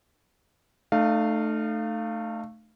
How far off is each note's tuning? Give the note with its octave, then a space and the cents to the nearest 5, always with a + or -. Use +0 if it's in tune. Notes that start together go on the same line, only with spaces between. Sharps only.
A3 +0 D#4 -40 F5 -10